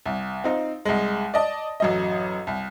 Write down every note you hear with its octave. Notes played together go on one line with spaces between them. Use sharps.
C2
C4 D#4 F4
C2 G#3
D5 D#5 A5
A1 F#2 D#5
C2